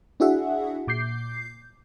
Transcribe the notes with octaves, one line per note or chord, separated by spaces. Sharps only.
D4 E4 F#4 G#4 E5 F#5
A#2 D6 G6 C7